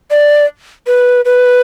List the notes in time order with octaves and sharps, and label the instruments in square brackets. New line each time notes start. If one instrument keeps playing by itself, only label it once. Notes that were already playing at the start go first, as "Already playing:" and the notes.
[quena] D5
B4
B4